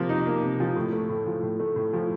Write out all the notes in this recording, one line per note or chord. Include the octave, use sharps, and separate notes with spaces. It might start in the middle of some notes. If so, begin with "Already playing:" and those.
Already playing: C3 F3 A#3
D#4
A#3
C3
F3
A2
A3
A2
F3
A2
A3
A2
F3